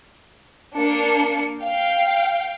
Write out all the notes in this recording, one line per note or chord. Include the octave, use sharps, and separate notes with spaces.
A#3 D4 C#7
F5 G5